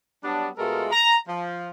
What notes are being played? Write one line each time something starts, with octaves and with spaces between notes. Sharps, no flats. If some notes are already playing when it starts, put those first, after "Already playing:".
F#3 G3 B3 D4
B2 G#3 A3 F4 A4 A#4
A#5
F3